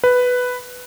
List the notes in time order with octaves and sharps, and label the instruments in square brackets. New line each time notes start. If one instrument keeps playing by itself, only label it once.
[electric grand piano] B4